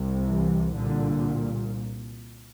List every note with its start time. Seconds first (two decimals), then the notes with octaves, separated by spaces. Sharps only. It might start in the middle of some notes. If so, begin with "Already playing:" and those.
Already playing: C2 C3
0.29 E3
0.76 C2 A#2 D3